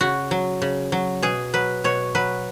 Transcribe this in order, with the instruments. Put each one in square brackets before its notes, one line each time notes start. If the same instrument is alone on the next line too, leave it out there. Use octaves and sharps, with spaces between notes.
[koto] C#3 F#4
F#3
C#3
F#3
B2 G#4
F#3 B4
B2 C#5
F#3 B4